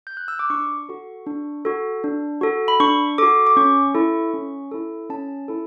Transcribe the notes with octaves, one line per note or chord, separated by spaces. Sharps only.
G6
F#6
E6
D6
D4 C#6
F#4 A4
D4
F#4 A4
D4
F#4 A4
B5
D4 C#6
F#4 A4 D6
D6
C#4 C#6
E4 A4
C#4
E4 A4
C#4 A5
E4 A4